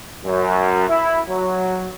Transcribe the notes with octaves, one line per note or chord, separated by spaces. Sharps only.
F#2
E4
F#3